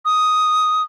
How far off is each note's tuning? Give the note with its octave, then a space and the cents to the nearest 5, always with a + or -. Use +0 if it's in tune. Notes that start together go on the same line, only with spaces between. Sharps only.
D#6 +5